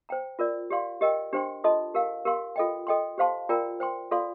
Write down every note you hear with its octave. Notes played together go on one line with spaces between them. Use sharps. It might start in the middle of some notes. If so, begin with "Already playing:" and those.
C5 G5 A#5
F4 A#4 D5
G4 D5 F5 C6
G4 A#4 D#5 G5
D4 G4 C5 G5 C6
F4 A4 D#5 A5 C6
G4 A#4 F5
G4 A#4 F5 C6
F4 A4 D#5 G5
A4 D#5 G5 C6
G4 C5 F5 A5 C6
F4 A#4 D5 G5 A#5
C5 G5 C6
F4 A4 D5 F5 C6